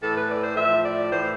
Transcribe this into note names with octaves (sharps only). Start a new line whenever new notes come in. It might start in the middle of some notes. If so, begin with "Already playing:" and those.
A2 E3 A4
B4
D5
C5
A2 F3 E5
D5
A2 E3 C5